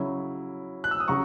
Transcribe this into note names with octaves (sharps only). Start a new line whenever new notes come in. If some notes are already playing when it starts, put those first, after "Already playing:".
Already playing: C#3 F#3 C#4 E4
F#6
E6
D#6
C#3 F#3 C#4 A#5 C#6